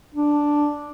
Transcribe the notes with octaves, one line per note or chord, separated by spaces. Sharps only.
D4